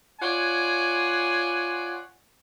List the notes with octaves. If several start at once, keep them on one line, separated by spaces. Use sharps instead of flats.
F4 C#5 D5 F#5 G#5